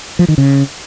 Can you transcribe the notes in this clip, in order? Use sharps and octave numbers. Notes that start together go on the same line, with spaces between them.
F3
D#3
C#3